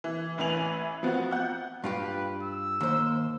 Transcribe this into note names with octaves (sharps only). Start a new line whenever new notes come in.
E3
A1 E3 B4 G#5 F7 F#7
F3 B3 C4 F#4
F#5 G6
G2 F4 G4 B4
E6
D#2 C5